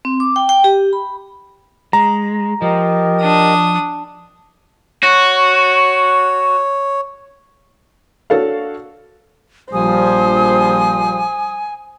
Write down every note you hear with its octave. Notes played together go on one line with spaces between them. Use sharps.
C4
D6
G5
G5
G4
B5
G#3 A#5
F3 G4 A#4 D#5
D4 D#6
F#4 C#5
D4 F#4 A4 C#5 F5
A#1 F3 G3 C5 G#5 D#6